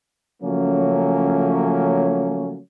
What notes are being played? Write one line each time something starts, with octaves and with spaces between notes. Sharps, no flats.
C#3 F3 F#3 A3 A#3 C#4